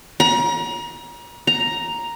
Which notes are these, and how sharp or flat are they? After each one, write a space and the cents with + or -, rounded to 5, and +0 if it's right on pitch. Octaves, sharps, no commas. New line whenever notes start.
A#5 +35
A#5 +5